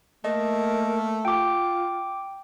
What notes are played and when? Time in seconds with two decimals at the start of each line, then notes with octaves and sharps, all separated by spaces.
0.25 A3 A#3 D#5
1.25 F4 G5 D6